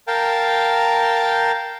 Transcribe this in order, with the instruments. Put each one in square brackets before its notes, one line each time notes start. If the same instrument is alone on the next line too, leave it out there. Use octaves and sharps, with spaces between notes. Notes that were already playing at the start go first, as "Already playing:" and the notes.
[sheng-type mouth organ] A#4 F5 G5 A5